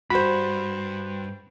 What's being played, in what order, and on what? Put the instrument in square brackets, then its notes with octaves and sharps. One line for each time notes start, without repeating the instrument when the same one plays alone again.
[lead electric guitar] G2 [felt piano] F#4 C5 [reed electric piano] B5